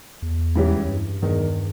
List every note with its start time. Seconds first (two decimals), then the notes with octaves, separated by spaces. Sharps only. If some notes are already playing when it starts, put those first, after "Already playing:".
0.22 E2
0.56 G#2 E3 G3 C#4 G4
0.78 E2
0.89 G2
1.22 E2 G2 D#3 G#3